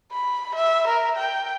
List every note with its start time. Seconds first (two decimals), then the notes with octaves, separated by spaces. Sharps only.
0.12 B5
0.55 E5
0.87 A#4
1.16 G5